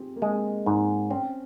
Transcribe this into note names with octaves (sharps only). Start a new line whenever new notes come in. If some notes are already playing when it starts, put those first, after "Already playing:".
Already playing: C4 F4 G4 G#4
A#3
G#3 C4
G#2 C4
C4 C#4